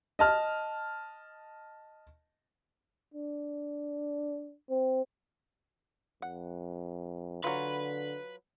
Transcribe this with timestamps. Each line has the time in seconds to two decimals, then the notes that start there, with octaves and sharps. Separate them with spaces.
0.19 D#5 A5 F6
3.14 D4
4.70 C4
6.22 F2 F#5
7.44 D3 F#3 F4 B4